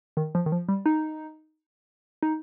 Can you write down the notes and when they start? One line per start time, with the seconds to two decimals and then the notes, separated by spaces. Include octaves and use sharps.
0.17 D#3
0.35 F3
0.46 D#3
0.52 F3
0.69 G3
0.86 D#4
2.23 D#4